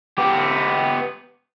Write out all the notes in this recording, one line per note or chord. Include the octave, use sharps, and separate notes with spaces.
B3 G4